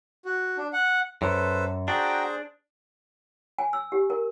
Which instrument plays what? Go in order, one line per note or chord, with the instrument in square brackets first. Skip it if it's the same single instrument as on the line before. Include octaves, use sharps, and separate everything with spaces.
[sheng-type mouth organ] F#4
D4
F#5
[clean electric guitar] F#2 [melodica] A4 B4 [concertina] C5
[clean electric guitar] D4 [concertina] F#4 G5 A#5 [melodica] G#4 C5
[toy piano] G#5
E6
G4
A#4